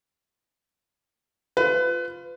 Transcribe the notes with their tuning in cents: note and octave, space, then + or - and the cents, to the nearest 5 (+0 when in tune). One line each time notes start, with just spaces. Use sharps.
F4 +0 B4 +25